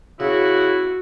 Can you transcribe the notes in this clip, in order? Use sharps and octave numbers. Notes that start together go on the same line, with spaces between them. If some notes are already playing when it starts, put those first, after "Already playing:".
C#3 E4 F#4